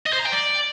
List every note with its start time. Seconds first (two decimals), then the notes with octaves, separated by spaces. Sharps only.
0.06 D#5
0.13 C5
0.19 A#5
0.26 G5
0.32 D5